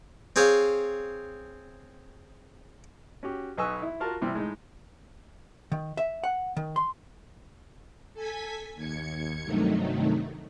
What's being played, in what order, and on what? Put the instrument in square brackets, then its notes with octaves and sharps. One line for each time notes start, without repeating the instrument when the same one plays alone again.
[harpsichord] C4 G#4 C5 C#5 F5
[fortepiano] C#4 F#4 G4
B1 B4 D#5 G#5 C#6 E6
E4
F4 F#4 A#4 A5
C3 E3 G3 C4
A2 G#3 D#4
[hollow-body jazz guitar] D#3
E5
F#5
D#3
C6
[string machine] A4 G#5 G#6 B6
D#2 G#6 C#7
G2 C3 D#3 F#3 A3 D#4